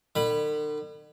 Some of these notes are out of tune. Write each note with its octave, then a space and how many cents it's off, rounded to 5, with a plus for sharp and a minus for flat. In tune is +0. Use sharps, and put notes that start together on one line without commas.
D3 +45 B5 +0